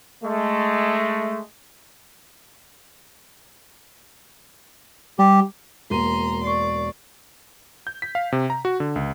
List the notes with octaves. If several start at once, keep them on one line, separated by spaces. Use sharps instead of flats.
G#3 A3
G3 G4
E1 A#3 A#5 C6 D#7
D5 C#6 C7
G6
B6
F5
C3
A#5
F#4
D3
C#2